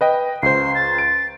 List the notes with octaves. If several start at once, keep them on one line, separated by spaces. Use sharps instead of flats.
B4 D#5 G5
C#2 C5 C7
A6
D7